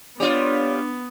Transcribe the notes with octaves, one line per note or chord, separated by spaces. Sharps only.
G3 B3 D4 F4 C#5